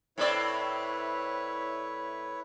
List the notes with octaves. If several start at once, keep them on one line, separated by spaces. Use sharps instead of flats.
A2 C4 E4 B4 C#5 D5